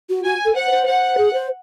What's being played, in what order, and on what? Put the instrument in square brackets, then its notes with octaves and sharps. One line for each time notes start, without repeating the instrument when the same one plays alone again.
[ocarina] F#4
[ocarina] F#4 [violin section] G#5
[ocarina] A4
[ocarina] C5 [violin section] F#5
[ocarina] C5
[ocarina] C5 [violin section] F#5
[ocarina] G#4
C5